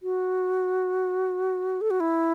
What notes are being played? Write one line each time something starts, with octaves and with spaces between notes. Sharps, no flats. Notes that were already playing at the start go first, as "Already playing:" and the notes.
F#4
A4
F#4
E4